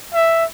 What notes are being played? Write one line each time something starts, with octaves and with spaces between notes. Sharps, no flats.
E5